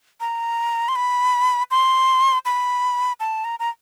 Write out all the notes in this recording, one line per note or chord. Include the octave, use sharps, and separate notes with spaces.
A#5
C6
B5
C6
B5
A5
A#5
A#5